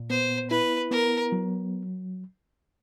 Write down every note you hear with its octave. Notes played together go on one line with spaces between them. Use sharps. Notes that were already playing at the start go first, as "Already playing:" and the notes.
Already playing: A#2
B3 C5
E4 B4
B3 A#4
F#3